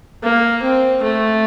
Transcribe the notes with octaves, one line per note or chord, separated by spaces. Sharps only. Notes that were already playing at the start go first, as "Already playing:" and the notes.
A#3
C4
A3